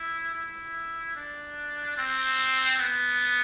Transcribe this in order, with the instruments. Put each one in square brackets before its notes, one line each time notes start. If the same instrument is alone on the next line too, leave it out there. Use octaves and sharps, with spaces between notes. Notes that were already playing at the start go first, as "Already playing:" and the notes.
Already playing: [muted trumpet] E4
E4
D4
C4
B3